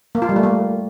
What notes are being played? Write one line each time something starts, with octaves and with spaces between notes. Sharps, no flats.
A#3
F4
G3
A3
A#3